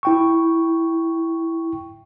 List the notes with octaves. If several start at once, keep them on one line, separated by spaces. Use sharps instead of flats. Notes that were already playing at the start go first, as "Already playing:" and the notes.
E4 G5 C#6